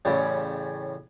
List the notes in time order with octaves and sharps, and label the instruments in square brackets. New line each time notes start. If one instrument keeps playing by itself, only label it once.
[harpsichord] A1 C#3 G3